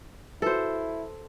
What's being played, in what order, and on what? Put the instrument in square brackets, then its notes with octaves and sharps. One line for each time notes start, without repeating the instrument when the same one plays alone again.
[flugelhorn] E4 [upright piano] F#4 B4 [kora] A4 C5